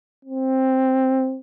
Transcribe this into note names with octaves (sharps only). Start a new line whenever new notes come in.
C4